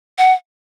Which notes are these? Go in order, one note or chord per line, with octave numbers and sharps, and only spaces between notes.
F#5